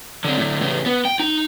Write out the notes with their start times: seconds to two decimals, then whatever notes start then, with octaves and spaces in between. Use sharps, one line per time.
0.24 D3 C4
0.38 A2 D3
0.61 A2 C#3
0.86 B3
1.05 G5
1.20 D#4